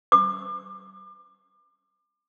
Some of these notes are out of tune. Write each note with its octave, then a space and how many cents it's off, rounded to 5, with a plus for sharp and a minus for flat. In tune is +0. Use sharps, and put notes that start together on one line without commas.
D6 +35